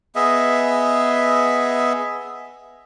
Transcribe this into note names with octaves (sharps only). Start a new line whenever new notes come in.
B3 G#4 D#5 E5